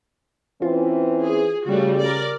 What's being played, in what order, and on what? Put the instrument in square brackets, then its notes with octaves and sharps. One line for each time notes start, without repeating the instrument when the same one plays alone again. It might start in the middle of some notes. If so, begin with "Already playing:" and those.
[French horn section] E3 C4 C#4 [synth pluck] F4
[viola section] G#4
[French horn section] C#3 [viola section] G3 A3 F#4
[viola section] A#4 D5